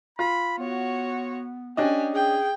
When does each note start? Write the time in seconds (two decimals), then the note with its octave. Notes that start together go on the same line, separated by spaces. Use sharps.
0.19 F4 B5
0.58 B3 F#4 C#5
1.77 C#4 D4 G4 D#5 G#5
2.15 G#4 G5